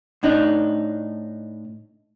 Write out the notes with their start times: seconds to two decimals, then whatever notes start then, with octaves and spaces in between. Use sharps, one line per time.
0.23 A2 D4 D#4